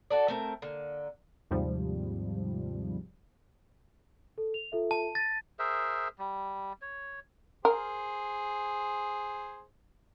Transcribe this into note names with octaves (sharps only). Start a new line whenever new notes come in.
F#4 A4 D5
A3 C4 A#4
D3 A#3
D#2 G#2 C3 F3 G3
A4
F7
F4 A4 E5
A5
A6 A#6 D#7
G#4 A#4 C5 E5
G3
C#5
G#4 A#4 C5